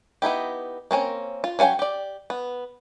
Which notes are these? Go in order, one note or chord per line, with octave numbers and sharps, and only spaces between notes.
B3 D#4 E4 G4
A#3 C4 C#4 A#4
F4
F#3 C#4 F5 G5 G#5
G4 D5
B3